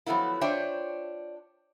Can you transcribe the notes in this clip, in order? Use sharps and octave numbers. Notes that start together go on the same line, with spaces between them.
F3 F#3 A3 B3 E4
D4 F4 C5 C#5 E5 G5